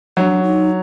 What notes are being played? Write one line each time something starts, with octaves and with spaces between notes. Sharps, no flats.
F#3 D#4
D4
D#4